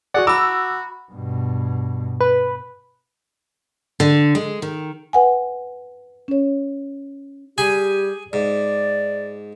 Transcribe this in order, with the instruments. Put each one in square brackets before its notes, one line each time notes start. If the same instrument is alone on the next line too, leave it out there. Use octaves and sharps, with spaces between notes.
[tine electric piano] F#4 G#4 D5 [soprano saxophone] F#5
[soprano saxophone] F#4 [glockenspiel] A#5 B5 [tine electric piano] D6 [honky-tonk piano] E6
[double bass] G2 B2
[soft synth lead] B4
[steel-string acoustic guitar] D3
G#3
D#3
[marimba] B4 F#5 G#5
C#4 C#5
[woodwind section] G3 G4 [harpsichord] G#4 G#5 B5
[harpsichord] G#2 [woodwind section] D5